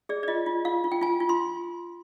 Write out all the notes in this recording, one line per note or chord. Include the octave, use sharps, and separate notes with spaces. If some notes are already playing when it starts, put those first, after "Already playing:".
G#4 D5
D5
F4 D#5
F4
F4 F5
F4
G5
F4 G#5
F4
C6